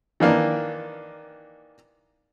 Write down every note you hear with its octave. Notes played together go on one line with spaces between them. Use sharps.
D#3 E3 A#3 D4